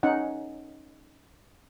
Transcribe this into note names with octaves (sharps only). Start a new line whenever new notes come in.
C#4 D#4 F#5